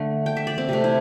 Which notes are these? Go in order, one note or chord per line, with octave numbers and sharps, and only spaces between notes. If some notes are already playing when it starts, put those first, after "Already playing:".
Already playing: D3 A3
G5
E5
D5
C4
C3 A3
E4